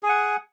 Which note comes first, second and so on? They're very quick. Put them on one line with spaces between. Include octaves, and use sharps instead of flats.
G#4 G#5 F#5